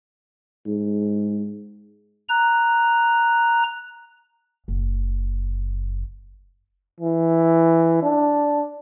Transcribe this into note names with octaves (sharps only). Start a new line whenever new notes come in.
G#2
A#5 F#6
F#1
E3
D4